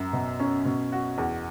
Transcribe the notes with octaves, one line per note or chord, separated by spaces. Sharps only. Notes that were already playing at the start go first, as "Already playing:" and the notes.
Already playing: F#2
B2
C#4
B2
F#4
E2